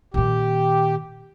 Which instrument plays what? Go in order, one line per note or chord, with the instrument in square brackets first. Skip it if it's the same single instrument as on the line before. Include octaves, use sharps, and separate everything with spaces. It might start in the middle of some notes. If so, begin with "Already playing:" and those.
[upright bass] A#2 D#3 [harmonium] G4